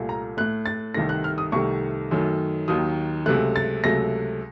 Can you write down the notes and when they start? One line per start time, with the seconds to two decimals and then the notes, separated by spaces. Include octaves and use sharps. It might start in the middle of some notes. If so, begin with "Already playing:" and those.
Already playing: C2 A#2 A3
0.09 A#5
0.37 A2 A3 F#6
0.66 A6
0.94 C2 C3 D#3 A3 A#6
1.09 F#6
1.24 F6
1.38 D#6
1.52 C2 C3 D#3 A3 C#6
2.11 F#2 D#3 F#3 A3
2.68 D#2 D#3 F#3 D#6
3.26 C#2 C3 F#3 A3 F#6
3.56 A6
3.84 C#2 C3 F#3 A3 A#6